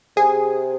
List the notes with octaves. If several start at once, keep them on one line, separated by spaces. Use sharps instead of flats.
C3 G#4